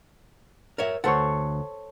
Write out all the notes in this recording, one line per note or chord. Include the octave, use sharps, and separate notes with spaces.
A#4 C#5 E5
D2 A4 C5 C#5 F#5